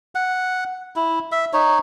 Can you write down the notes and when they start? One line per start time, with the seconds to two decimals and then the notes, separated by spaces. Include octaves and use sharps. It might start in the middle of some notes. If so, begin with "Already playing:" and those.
0.15 F#5
0.96 E4
1.32 E5
1.53 D#4 C#5